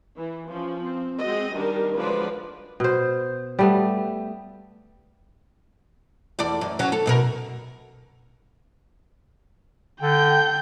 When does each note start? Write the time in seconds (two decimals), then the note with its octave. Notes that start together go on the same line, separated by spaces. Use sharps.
0.18 E3
0.51 F3 C#4
0.84 C4
1.20 G#3 C4 F#4 D#5
1.54 D#3 G3 D4 G4 A#4
1.96 D3 F3 F#3 G#3 B4 D5
2.80 B2 C5
3.59 G3 A3 B3
6.39 E2 A4 D5
6.61 F#2
6.79 F#3 C#4
6.92 A4
7.06 F#2 B2 A#4
10.02 D3 G5 G6